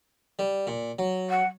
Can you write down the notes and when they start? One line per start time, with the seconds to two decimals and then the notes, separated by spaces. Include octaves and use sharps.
0.39 G3
0.67 A#2
0.99 F#3
1.30 F#5